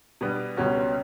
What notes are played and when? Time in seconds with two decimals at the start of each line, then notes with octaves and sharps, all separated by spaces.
0.21 B2 G3 B3 D4
0.57 C#2 B2 G3 C#4 F#4